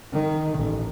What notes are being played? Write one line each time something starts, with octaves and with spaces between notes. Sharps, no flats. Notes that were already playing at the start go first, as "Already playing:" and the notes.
D#3
A1